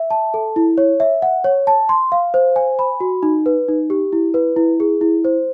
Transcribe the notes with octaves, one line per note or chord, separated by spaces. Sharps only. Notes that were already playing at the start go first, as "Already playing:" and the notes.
Already playing: E5
A5
A4
E4
C#5
E5
F#5
C#5
A5
C6
F5
C5
G#5
B5
F#4
D#4
B4
D#4
G4
E4
B4
E4
G#4
E4
C5